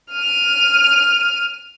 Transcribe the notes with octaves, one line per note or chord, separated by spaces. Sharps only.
F6 D#7